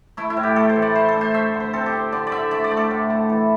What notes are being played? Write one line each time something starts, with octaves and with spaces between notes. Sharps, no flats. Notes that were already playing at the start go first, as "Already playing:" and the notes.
A3 E4
E4
A2
G4
A3 A4
C5
E3
D5
A3 C5
A4
D4
C5
A3 E5
D3
C5
C4 A4
G4
C4
D3 D5
D5
D3 E5
A3 D5
D5
A3
A4
A2
A3
E3